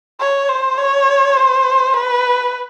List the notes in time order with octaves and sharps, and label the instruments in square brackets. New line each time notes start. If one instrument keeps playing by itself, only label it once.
[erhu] C#5
C5
C#5
C5
B4